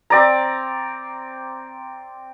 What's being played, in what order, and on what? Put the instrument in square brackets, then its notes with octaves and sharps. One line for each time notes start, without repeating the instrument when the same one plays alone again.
[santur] C4 D5 A#5